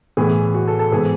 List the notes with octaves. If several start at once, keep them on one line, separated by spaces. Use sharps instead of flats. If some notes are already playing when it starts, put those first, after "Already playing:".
A2 E3 B3 G#4
F#4
A4
A4
G#2 E3 B3 G#4